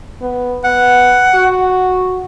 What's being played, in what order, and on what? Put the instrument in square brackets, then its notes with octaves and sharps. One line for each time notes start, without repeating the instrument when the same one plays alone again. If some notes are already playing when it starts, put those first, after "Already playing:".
[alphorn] B3
[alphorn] B3 [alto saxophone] F#5
[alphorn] F#4